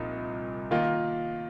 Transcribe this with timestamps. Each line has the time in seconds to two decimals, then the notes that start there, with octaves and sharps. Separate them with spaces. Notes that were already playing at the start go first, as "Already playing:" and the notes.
Already playing: C2 A#2 F3 D#4
0.71 D#3 A#3 F4